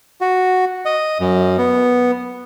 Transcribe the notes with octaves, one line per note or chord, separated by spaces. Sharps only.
F#4
D#5
F#2
B3